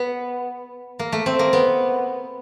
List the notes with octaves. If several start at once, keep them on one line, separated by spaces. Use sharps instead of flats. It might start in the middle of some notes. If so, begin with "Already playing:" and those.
Already playing: B3
A#3
A3
C4
A#3
B3